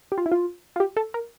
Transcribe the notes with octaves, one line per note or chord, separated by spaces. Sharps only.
G4
F4
E4
F4
F4
G4
A4
A#4